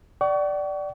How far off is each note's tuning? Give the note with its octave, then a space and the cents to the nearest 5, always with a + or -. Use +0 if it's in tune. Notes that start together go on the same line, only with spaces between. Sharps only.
D5 +0 F#5 +45 C#6 +30